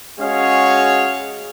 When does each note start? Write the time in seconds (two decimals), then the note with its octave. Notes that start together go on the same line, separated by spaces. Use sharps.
0.20 G#3 C#4 F#4 G#4 C#5 F5